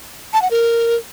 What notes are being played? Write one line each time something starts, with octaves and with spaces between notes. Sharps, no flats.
A5
F#5
A#4